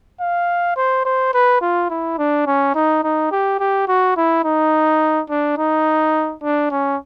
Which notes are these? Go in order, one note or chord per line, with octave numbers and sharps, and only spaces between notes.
F5
C5
C5
B4
F4
E4
D4
C#4
D#4
D#4
G4
G4
F#4
E4
D#4
D4
D#4
D4
C#4